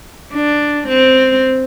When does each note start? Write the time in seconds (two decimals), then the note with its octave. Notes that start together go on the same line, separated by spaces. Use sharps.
0.33 D4
0.88 C4